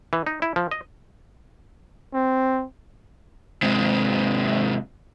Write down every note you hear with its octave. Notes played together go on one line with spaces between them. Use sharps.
E3
D#4
E4
F3
D#5
C4
G#2 C3